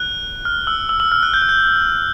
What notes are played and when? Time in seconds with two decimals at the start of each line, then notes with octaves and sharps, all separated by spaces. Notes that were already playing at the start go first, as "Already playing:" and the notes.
Already playing: F#6
0.45 F6
0.67 E6
0.89 E6
1.00 E6
1.12 F6
1.23 F#6
1.34 G6
1.42 F#6
1.49 G6